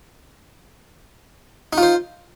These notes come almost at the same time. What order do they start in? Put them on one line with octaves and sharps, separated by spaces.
D#4 F4 C5